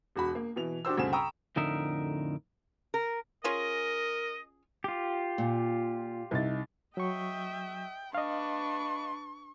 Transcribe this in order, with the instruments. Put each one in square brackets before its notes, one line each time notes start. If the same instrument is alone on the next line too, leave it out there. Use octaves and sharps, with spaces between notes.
[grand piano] E1 F#4 B5
A#3
B2 E3 F7
D4 F#4 G4 C5 E6
D2 G2 C#3 C4 E7
G5 A#5 B5 C#6 D#6 E6
[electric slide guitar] F2 A2 D3 D#4 A#4 E5
[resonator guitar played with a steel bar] A#4
[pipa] C#4 F4 G#4 [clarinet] A#4 [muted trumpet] D#5
[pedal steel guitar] F4 G4
[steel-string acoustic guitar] A#2
[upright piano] C2 D#4 A6
[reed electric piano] F#3 C#6 [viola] D#5 E5 [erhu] G5
[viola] D4 B4 [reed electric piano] D#5 F5 [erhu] C#6